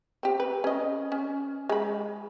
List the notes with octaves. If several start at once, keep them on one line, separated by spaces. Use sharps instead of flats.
C4 G4
B4
C#4 D#5
C#4
G#3 B5